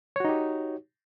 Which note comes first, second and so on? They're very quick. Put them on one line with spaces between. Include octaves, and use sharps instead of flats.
C#5 F#4 D#4 G4